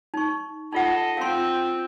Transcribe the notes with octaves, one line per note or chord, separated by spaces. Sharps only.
D#4 C#6
D#4 F4 A4 D#5 F#5
C4 F4 F5 C6